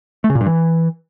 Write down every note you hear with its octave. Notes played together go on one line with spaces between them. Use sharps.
A3
C#3
A#2
G2
E3